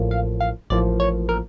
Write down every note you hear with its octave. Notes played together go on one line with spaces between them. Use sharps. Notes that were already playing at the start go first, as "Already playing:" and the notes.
Already playing: A1 A2 F3 A#3
F5
F5
A1 A2 F3 A#3 D5
C#5
A#4